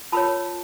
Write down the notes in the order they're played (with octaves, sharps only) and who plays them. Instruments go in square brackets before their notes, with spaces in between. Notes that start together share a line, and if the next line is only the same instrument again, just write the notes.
[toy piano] F4 A#4 C#5 A5 B5